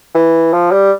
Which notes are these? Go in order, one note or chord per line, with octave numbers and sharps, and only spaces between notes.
E3
F3
G3